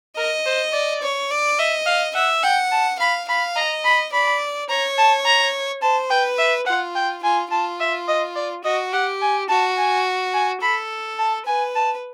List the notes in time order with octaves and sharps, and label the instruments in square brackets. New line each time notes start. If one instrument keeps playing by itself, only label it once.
[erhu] A#4 [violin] D#5
[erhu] C5
D5
[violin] C#5
D5
[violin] D#5 [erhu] E5
[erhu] F5
[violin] E5 [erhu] F#5
[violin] F#5 [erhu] G5
[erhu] A5
[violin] F5 [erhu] B5
[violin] F5 [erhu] B5
[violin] D#5 [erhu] A#5
[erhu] B5
[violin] D5 [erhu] B5
[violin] C#5 [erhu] A#5
[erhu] A5
A#5
[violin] C5 [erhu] A5
[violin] B4 [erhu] G5
[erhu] E5
[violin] F4 [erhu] F#5
[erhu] G5
[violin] F4 [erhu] G#5
[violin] F4 [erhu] A5
[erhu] E5
D#5
D5
[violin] F#4 [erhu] D#5
[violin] G4 [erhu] F#5
[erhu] G#5
[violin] F#4 [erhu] A5
[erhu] G#5
G#5
[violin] A4 [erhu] B5
[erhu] A5
[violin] B4 [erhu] G#5
[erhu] A5